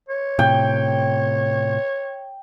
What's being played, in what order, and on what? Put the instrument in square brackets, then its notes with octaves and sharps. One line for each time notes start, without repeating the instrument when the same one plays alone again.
[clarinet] C#5
[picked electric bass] A2 C3 [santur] G5